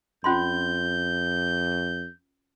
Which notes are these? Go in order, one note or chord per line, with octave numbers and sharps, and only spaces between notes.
F2 C#4 F4 C6 G6